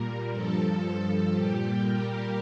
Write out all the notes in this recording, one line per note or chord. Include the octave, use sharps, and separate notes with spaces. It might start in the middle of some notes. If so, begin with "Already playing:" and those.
Already playing: A#2 G3 A#4
G2 F3 A4
A#2 G3 G4
A#4